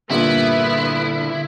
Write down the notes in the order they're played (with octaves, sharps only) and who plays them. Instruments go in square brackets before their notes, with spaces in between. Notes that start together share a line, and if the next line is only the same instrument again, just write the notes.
[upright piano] G2 A#2 [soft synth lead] D3 [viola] B3 [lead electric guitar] E4